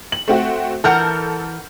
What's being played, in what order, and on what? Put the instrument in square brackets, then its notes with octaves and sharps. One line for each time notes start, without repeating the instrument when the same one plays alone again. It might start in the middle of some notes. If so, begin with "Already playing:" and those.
[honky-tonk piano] F#7
A3 C4 F#4
[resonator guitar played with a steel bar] E3 A#4 F#5 [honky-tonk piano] A4 F6 G6